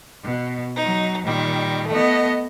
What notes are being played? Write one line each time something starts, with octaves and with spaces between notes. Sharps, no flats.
B2
F#3 D#4
A#2 D#3 G3
A3 B3 D#5